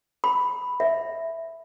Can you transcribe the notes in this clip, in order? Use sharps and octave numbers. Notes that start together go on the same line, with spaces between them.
B5
E5